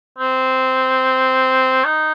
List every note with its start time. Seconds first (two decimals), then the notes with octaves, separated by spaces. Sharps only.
0.18 C4
1.85 D#4